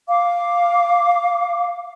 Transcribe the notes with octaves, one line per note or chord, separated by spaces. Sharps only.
F5 D6